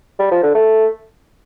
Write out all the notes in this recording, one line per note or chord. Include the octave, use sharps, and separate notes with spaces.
G3
F3
D3
A3